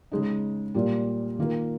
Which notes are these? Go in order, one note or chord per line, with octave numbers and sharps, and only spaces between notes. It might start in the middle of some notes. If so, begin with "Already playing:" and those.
C#3 G#3 D#4
A#2 G3 A#3
D#3 A#3 F4 A#4